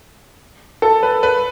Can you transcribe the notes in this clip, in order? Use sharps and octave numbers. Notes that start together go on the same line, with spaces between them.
A4
B4
B4